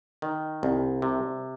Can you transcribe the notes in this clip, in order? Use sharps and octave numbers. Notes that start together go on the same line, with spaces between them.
D#3
C2
C3